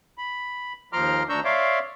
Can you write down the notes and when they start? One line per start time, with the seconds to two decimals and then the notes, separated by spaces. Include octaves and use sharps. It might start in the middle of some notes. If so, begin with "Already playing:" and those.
0.18 B5
0.93 D#2 F3 A#5 C6 D6 F6
1.29 D2 D4 A#5 C#6 E6 G6
1.45 C#5 D5 E5 F5 C6 D6